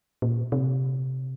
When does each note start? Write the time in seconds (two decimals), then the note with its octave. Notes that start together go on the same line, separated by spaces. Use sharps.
0.22 A#2
0.52 C3